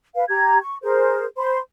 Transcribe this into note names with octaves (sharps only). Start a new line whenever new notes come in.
B4 F5
G4 A#5 G#6
C#6
G#4 A#4 C5
C5 B5 C6